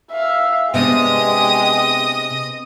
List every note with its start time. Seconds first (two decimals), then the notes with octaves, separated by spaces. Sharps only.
0.11 E5 F5
0.74 C3 G#3 B3 D4 G4 D#5 D#6